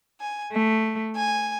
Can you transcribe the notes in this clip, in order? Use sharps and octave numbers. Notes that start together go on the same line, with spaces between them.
G#5
A3
G#5